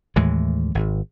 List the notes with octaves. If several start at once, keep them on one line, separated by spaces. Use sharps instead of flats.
D#2 A2 E3 G#3
G#1